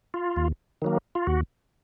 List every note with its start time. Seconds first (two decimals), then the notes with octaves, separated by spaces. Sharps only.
0.14 F4
0.36 D#2
0.82 D#3 F#3 A#3
1.15 F4
1.27 D#2 F#4